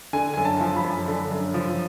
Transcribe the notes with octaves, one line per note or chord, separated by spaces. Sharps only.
D3 G#5
F#2 G#5
A5
F3
B5
F#2
D3
F#2
F3